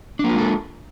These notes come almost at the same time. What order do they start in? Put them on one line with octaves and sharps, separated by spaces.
D4 A#3 F4 G#3 A4